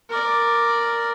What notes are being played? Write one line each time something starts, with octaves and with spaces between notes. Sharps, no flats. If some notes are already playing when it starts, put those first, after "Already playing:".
A#4 D5